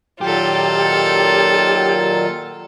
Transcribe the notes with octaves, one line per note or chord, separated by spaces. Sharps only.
A#2 D#3 F#3 F4 G4 A4